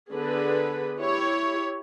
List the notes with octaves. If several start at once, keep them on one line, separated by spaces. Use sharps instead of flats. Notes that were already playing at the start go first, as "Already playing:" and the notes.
D3 B3 G#4 B4
E4 G4 C#5